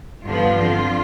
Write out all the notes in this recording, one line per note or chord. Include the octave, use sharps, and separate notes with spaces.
G2 D3 F3 B3 F4
D3 F3 C4